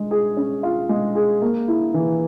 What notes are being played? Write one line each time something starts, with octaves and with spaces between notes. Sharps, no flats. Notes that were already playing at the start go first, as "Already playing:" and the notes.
Already playing: G#3
G#4
C#4
F4
G#3
G#4
A#3
E4
E3